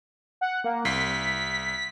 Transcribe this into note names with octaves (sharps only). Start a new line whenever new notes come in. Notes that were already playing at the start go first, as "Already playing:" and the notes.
F#5
A#3
C2 B6 C7